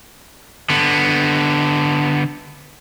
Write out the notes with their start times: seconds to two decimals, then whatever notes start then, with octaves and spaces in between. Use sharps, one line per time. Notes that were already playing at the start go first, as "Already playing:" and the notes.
0.70 D3 B3